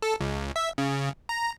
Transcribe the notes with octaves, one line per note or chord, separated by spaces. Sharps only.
A4
C#2
E5
C#3
A#5